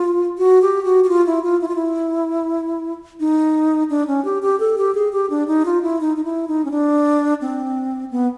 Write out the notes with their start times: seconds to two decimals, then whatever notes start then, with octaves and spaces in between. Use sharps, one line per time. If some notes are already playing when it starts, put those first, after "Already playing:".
Already playing: F4
0.38 F#4
0.62 G4
0.85 F#4
1.04 F#4
1.09 F4
1.26 E4
1.43 F4
1.61 E4
1.68 F4
1.75 E4
3.20 D#4
3.90 D4
4.07 C#4
4.25 G4
4.42 G4
4.60 A4
4.78 G4
4.95 G#4
5.13 G4
5.30 D4
5.48 D#4
5.66 F4
5.83 E4
6.01 D#4
6.16 D#4
6.24 E4
6.48 D#4
6.65 C#4
6.71 D4
7.41 C4
8.11 B3